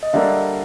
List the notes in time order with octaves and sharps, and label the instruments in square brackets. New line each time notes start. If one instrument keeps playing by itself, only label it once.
[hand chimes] D#5
[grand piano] D3 G3 A#3 [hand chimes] E5